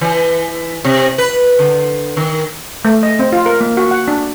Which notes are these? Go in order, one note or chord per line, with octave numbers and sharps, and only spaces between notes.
E3
C3
B4
D3
D#3
A3
D#5
C4
F4
A#4
A#3
F#4
F#5
D4